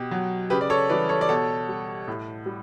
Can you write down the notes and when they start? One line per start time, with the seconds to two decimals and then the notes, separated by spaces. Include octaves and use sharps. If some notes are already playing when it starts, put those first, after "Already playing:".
Already playing: B2 G4
0.11 F#3
0.50 C#3 G4 B4
0.61 D5
0.70 A4 C#5
0.90 E3 G3 B4 D5
1.09 A4 C#5
1.21 D5
1.29 B2 A4 C#5
1.68 G3
2.08 A2
2.46 G3